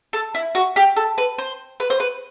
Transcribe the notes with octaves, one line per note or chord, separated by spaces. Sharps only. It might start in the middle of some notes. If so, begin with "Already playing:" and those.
A4
E4
F#4
G4
A4
B4
C5
B4
C5
B4